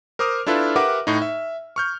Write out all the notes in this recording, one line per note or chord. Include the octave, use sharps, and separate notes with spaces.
A#4 C5 D6 D#6 F6
D4 E4 F4 A4 B4
G4 A#4 B4 E5 F#5 D6
A2 D#4
E5
C#6 F6 G6